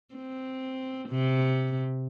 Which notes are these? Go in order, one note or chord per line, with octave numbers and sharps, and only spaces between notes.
C4
C3